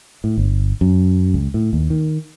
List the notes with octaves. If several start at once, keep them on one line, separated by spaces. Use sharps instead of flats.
A2
G1
F#2
C#2
A2
D#2
D#3